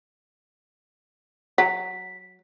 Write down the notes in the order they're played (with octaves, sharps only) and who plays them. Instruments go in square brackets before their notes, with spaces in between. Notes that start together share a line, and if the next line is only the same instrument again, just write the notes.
[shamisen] F#3 [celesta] B6